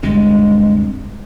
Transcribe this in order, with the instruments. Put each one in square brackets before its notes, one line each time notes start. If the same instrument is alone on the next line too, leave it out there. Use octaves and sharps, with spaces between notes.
[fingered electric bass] D2 G2 C3 [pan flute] G#3